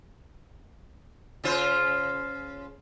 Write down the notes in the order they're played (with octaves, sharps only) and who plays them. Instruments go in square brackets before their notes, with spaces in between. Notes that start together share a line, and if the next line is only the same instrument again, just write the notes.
[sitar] C#3 F4 C5